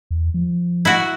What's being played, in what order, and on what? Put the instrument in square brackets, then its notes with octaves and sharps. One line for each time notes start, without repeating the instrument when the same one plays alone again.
[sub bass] E2
F3
[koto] E4 F#4